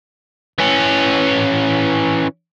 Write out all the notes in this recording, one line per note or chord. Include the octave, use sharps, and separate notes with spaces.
E3 C#4